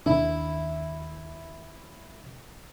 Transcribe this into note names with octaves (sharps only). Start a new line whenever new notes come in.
D#2 D#3 D4 E4